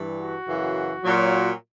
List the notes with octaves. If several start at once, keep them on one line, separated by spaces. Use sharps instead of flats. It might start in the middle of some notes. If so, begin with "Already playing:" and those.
Already playing: G2 E3
F#4
F#2 C#3 E3
A#2 F#3